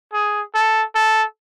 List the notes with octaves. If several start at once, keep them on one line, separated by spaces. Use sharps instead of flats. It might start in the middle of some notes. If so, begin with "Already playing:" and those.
G#4
A4
A4